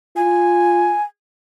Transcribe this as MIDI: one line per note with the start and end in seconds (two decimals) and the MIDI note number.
0.16 0.94 65
0.16 1.03 80